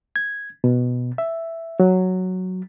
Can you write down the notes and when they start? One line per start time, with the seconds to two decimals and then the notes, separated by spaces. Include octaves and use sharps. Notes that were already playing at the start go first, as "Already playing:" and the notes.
0.16 G#6
0.64 B2
1.18 E5
1.80 F#3